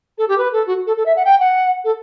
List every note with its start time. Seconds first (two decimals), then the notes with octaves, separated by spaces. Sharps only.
0.18 A4
0.28 G4
0.38 B4
0.53 A4
0.67 F#4
0.87 A4
0.97 A4
1.06 E5
1.16 F#5
1.25 G5
1.40 F#5
1.84 A4